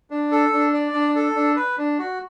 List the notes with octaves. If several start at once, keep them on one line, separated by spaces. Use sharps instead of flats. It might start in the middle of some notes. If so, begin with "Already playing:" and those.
D4
A4
D4
D5
D4
A4
D4
B4
D4
F#4